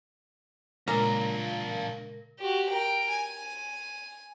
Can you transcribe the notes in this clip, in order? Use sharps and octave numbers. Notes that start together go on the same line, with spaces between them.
A#2 C#3 G#3 D4 F4 A#4 A#5 A#6
F#4 G4
A#4 G5
G#5